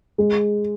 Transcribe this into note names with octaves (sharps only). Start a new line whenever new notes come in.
G#3